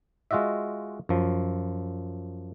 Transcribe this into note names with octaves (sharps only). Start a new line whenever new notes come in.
G#3 F4 F#4 D#5 E5
F#2 F3